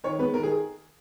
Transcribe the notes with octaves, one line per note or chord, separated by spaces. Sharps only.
D#3 C#5
G#3 B3 B4
D#3 A#4
G#4